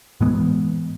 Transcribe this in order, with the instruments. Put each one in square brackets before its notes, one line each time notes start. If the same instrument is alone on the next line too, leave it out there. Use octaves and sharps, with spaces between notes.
[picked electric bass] A2 E3 G#3 B3